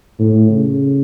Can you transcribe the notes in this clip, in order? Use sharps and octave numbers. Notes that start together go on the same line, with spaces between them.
A2
C#3